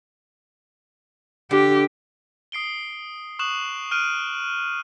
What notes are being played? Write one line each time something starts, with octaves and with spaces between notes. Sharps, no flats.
D3 G4
D#6 C7 D7 G7
C#6 D#6 F#6 E7 F#7
F6 F#6 D7 D#7